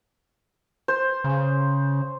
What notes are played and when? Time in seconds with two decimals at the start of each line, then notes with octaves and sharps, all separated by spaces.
0.88 C5
1.24 C#3